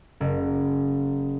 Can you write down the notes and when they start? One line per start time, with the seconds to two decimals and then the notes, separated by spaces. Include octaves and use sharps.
0.20 F#1